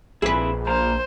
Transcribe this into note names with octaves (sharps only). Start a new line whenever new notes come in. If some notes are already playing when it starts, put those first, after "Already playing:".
A#1 C4 E4 G#4 B4
A#2 A#3 C5 A#5